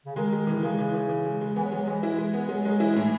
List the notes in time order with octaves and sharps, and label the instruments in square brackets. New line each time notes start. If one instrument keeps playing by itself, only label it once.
[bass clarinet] C#3
[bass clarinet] D#3 [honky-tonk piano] G#3
[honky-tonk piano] G#3
E3
[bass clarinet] C#3 [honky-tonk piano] G#3
[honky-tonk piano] E3
E3
E3
G#3
G#3
[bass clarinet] E3 [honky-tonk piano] B3
[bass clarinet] F#3
[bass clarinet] E3 [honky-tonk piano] G#3
[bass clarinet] F#3
[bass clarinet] E3 [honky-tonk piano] G#3
[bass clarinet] E3 [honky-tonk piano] E4
[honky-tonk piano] G#3
B3
[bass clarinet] F#3 [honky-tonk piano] G#3
[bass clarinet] F#3 [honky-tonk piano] G#3
[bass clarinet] E3 [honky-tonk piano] E4
[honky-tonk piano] A2 [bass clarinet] E3